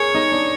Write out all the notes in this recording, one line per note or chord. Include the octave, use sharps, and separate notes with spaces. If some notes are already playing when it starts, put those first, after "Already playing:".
Already playing: G#4 A#4 C#5
D#4
D4